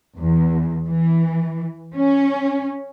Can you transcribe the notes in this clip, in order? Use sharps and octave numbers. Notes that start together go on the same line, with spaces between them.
E2
E3
C#4